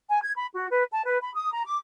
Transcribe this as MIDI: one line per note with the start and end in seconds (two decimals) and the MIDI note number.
0.09 0.19 80
0.23 0.32 92
0.37 0.47 83
0.54 0.67 66
0.71 0.84 71
0.91 1.03 81
1.05 1.19 71
1.21 1.31 83
1.35 1.52 87
1.52 1.62 82
1.66 1.77 86